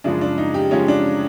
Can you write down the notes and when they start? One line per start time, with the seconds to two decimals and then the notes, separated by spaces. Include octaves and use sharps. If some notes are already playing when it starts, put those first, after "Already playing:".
0.04 F#2 C#3 F3 G#3 D4
0.21 D4
0.38 D#4
0.54 G4
0.71 F#2 C#3 F3 G#3 C#4
0.88 D4